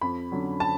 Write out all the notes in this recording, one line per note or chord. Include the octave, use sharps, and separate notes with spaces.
F2 B5
D3 F#3 C#4
A5